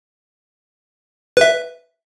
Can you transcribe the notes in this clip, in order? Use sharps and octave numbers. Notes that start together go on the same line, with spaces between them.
B4 E5